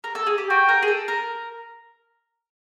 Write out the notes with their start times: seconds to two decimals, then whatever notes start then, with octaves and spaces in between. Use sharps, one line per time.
0.04 A#4
0.15 A4
0.26 G#4
0.38 G4
0.50 F#4 G5
0.69 A#4
0.83 G#4
0.88 A4
1.08 A#4